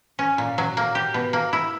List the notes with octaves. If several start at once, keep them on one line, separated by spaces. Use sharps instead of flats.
C#4
A#2
F#3
A#3
G4
B2
A#3
E4